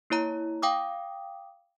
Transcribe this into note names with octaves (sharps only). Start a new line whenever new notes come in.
A#3 E4 C#5 A#5
F5 G5 D6 D#6